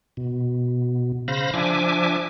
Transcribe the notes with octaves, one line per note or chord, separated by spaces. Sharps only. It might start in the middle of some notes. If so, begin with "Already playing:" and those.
B2
C#3 C5 F5 B5 A#6
F3 D4 E5 G#5 D6